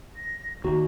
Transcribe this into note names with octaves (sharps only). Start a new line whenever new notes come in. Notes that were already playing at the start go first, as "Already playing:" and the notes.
A#6
D#2 F#4 A#5